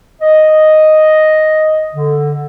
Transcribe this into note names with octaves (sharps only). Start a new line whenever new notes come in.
D#5
D3